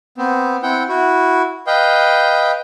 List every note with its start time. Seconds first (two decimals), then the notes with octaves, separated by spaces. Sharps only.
0.18 B3 C4
0.63 C4 E4 F#5 G5
0.88 E4 F#4
1.67 B4 D#5 F5 G5